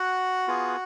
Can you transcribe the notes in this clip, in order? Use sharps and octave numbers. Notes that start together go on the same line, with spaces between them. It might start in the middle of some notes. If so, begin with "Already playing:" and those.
Already playing: F#4 F#5
B3 F4 G#4